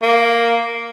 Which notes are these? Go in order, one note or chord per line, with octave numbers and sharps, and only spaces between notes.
A#3